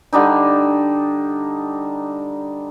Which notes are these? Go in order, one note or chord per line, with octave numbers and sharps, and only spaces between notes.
D3 G3 D4 D#4